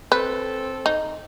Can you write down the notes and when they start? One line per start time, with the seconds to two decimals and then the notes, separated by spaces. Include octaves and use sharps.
0.12 C4 A4 B4
0.86 D#4